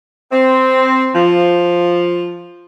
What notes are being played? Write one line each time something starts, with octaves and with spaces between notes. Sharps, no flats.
C4
F3